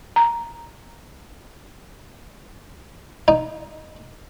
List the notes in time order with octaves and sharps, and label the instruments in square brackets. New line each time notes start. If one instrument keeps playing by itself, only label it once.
[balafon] A#5
[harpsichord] D#4